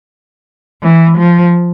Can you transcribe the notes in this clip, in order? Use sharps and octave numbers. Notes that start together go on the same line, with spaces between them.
E3
F3